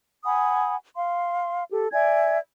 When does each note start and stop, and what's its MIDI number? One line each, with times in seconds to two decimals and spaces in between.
0.24 0.75 78
0.24 0.75 80
0.24 0.75 83
0.24 0.75 87
0.95 1.63 77
0.95 1.63 84
1.70 1.87 67
1.70 1.87 69
1.92 2.37 74
1.92 2.37 76
1.92 2.37 80
1.92 2.37 92